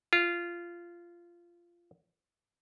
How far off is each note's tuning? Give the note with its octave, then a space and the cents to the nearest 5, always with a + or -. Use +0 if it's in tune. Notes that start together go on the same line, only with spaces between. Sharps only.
F4 -15